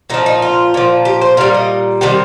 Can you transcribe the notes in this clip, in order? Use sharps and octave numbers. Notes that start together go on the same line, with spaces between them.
A#2 F3 D#4
D#4
F4
A#2 F3
G4
C5
A#2 G3 F5
D#5
C3 D#3 G3 G4